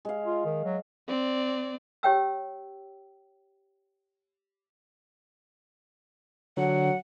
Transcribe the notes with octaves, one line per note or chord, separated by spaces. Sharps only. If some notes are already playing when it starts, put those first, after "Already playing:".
G#3 F5
F4
D#3
F#3
C4 D5
G4 C#5 G5 E6
D3 F#3 F#5